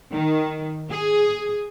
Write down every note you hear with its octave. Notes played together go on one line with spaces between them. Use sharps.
D#3
G#4